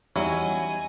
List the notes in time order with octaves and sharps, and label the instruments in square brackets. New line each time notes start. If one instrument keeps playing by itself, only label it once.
[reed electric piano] E2 G3 D#4 [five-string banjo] F#3 C#4 E4 [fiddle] D#5 G#5